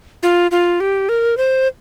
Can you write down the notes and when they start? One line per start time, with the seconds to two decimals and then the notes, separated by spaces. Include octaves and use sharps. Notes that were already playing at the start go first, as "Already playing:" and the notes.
0.23 F4
0.51 F4
0.80 G4
1.09 A#4
1.37 C5